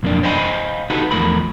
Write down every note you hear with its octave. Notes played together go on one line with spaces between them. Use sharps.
B1 F2 A#3 D4 D5
C5 D#5 F5 G5 G#5 B5
D#4 F#4 G4 A4 B4 F#5
E2 C3 F3 A3 A#4 B5